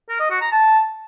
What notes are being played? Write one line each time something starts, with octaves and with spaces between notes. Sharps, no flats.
A#4
D#5
F#4
A#5
A5